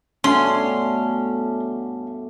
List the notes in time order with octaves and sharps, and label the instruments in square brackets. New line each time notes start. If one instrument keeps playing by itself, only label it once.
[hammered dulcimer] G2 B2 A3 [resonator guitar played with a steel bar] C#4 [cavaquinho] C6